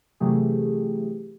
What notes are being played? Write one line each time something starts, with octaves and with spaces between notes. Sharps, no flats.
C3 E3 F#3 A3 G4 G#4